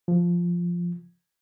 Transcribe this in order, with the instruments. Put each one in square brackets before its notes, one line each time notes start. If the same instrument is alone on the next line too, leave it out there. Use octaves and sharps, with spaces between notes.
[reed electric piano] F3